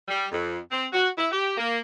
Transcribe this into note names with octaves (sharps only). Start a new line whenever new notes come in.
G3
F2
C4
F#4
E4
G4
A#3